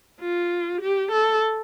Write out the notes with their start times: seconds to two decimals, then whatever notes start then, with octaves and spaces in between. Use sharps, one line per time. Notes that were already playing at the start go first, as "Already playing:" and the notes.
0.20 F4
0.81 G4
1.12 A4